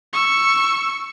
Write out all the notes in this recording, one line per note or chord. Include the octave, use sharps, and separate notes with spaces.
C#6 E6